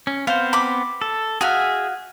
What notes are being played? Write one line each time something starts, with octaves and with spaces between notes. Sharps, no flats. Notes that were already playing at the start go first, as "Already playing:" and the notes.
C#4
B3 C4 C5 F5
B5 D6
A4
F#4 G#4 E5 F5